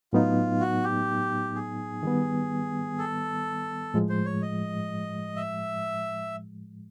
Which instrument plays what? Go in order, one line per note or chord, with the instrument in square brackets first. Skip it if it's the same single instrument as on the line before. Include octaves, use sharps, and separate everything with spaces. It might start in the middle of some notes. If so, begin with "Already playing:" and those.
[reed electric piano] A2 F#3 B3 D#4 [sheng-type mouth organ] F4
[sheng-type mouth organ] F#4
G4
G#4
[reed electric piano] D#3 G3 B3
[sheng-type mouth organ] A4
[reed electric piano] A2 F3 G#3
[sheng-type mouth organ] C5
C#5
D#5
E5